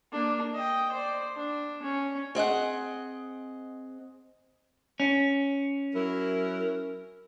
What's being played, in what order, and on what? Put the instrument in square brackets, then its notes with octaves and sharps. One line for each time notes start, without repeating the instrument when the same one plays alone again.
[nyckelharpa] A#3 D4
D#5 G5
C5 D5
D4
C#4
[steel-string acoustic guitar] C4 G#4 D#5 F#5
[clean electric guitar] C#4
[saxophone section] F#3 E4 A#4